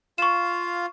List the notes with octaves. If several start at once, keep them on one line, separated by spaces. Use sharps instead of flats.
F4 F5 C#6 E7